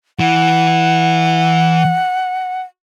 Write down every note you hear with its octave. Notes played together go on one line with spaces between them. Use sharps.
E3 F#5